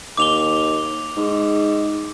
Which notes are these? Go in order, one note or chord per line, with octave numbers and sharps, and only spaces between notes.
D#2 D6 F7 G7
G#2